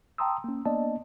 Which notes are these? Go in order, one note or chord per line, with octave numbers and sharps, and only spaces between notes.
G5 A5 A#5 C6 D#6 E6
A#3 C#4
A#3 B3 D4 D5 D#5 A5